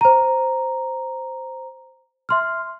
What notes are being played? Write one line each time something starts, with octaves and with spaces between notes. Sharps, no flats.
C5 A#5
E5 C6 F6